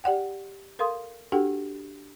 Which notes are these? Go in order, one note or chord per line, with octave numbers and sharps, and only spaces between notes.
G4 D5 F#5 G5
A4 A#4 F5 C6 D#6
D4 F#4 G4 A4 F#5 G5